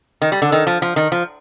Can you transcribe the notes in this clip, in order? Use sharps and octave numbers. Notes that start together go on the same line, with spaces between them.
D#3
G3
D3
D#3
F3
F3
D#3
F3